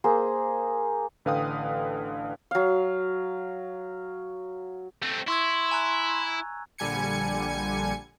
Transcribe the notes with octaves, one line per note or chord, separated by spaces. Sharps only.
A#3 G#4 C5
A1 D3 B4 F5 G5 D#6
F#3 F5
A3 C4
E4 C6 C#6 E6 G#6
G#5 A#5 F#6
A#1 D3 G3 G#5 G#6 C#7